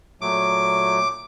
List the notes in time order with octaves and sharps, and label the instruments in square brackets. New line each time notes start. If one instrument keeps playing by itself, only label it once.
[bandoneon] A#2 F#3 A3 [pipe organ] D6